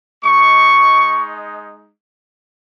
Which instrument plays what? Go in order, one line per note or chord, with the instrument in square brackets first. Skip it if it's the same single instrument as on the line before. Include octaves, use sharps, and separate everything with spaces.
[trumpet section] G#3 D#4 C#6